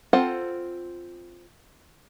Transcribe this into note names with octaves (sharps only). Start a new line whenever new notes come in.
C4 F4 A4 C5 F#5